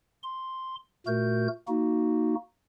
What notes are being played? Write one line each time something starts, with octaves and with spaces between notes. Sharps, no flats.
C6
A#2 A3 F#4 A#4 G6
A#3 D#4 F#4